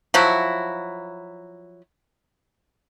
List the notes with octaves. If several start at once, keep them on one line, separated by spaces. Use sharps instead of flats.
F3 F#3 E4 F#4